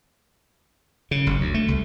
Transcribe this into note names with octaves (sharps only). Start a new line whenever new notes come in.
C#3
F#1
D2
A3
C2